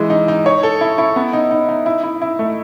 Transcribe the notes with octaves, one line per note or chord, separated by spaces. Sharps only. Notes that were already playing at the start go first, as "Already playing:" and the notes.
Already playing: E3 G#3
D#4
D#4
C#5
A4
E4
E4
B3
D#4
D#4
D#4
E4
E4
E4
A3